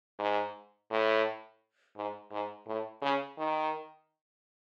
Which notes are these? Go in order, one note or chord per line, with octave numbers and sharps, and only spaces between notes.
G#2
A2
G#2
G#2
A2
C#3
D#3